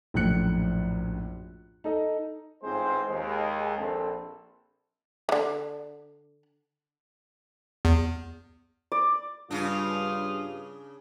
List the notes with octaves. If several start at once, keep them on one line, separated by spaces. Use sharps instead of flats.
A#1 F#2 A2 F3 F#6 C#7
D#4 A4 D#5
A1 G#2 G#3 C4 F4 C5
D#2 G#3 G#4
A#1 C4 A4
D3 E3
E2
D5
G2 C#3 D4 F4 F5 D#6